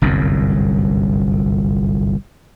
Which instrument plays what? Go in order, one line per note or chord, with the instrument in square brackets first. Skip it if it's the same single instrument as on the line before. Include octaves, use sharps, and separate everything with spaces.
[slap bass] G1 C2 F#2